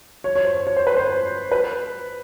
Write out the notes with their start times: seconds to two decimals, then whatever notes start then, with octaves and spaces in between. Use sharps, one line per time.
0.24 C#5
0.35 C#5
0.45 C5
0.67 C#5
0.77 C5
0.87 B4
0.97 C5
1.51 B4